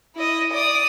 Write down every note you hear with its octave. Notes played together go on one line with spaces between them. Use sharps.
E4 D#5
D5 D#6